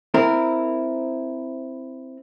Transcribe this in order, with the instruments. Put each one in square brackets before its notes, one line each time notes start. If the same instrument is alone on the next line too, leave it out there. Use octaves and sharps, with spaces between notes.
[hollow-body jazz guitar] C4 E4 A#4